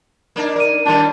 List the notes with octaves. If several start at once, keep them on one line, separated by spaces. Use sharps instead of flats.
A#3 D4 D#4
A#4 D5 D#7
A2 D#3 G3 D4